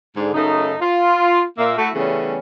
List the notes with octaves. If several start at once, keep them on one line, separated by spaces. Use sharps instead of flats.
G#2 D3
F#2 C#3 A3 D#4
F4
A#2 A#3 E5
A3 E4 F#4
C#3 E3 G3 A3 B3 C#4